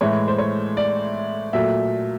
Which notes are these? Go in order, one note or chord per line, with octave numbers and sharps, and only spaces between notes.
A2 E3 G#3 C#5
C5
C#5
D5
A#2 F#3 A3 E5